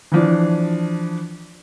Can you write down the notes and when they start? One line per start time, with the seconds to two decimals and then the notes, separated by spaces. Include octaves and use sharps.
0.12 E3 F3 D4